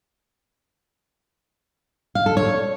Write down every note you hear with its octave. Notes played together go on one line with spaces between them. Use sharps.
F5
A4
C#5